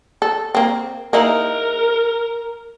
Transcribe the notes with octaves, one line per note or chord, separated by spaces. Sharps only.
A4
A#3 C4
A#3 D#4 E4 A#4